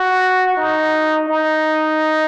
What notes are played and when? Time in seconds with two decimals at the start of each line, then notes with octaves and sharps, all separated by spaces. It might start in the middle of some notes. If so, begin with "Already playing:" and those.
Already playing: F#4
0.57 D#4
1.29 D#4